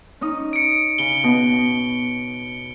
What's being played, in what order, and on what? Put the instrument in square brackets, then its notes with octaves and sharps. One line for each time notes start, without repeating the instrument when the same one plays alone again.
[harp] C#4 D#4 D#6
[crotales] C#7 D7
[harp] C#3 [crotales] G7
[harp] B2